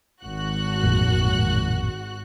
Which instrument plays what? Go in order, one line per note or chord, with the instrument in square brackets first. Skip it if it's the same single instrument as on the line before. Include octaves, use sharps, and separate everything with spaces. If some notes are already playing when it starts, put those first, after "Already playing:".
[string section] G#1 F#4 F#6
[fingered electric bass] A1 F2 A#2